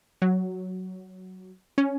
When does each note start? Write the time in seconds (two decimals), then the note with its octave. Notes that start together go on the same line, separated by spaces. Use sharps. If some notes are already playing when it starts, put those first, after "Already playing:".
0.22 F#3
1.78 C#4